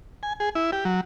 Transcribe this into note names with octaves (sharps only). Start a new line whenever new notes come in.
G#5
G#4
E4
G4
F#3